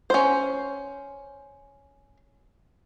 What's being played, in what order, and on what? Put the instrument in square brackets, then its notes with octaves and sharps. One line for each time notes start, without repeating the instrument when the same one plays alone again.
[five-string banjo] C#4 C5